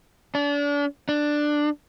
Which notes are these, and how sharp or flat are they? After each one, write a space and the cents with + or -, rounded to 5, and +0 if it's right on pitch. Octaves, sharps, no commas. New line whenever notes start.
D4 -35
D4 +10